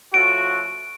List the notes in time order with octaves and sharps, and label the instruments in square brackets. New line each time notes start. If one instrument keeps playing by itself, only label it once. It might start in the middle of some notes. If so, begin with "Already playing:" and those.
[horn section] F3 A3 C#4 F#4 [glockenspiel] D7